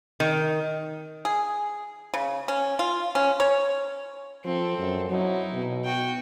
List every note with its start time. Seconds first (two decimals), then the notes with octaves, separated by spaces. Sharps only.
0.20 D#3
1.25 G#4
2.14 C#3
2.48 C#4
2.79 F4
3.15 C#4
3.40 C#5
4.44 F3 C4 A4
4.78 F#2
5.10 F#3 D#4 E4
5.53 B2
5.84 F#4 G5